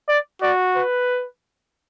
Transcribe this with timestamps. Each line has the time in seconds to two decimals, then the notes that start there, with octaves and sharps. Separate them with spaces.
0.08 D5
0.42 F#4 D5
0.76 B4